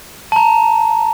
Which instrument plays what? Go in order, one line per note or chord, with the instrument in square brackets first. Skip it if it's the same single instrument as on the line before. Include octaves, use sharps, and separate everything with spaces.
[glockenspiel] A5 A#5